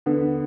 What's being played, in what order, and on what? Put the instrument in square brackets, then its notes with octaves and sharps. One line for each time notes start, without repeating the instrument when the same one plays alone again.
[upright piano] D3 [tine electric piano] B3